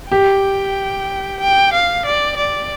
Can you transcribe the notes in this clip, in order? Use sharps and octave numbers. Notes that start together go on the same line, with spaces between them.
G4 G5
G5
F5
D5
D5